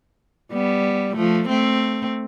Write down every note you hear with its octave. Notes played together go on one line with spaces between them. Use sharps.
G3 B3
F3 A3
A3 C4